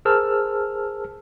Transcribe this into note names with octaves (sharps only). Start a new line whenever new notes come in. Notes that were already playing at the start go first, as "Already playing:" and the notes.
G#4 A#4 C5 A5 E6 F6